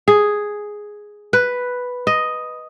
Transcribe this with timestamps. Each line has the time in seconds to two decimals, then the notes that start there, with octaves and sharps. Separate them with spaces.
0.08 G#4
1.33 B4
2.07 D#5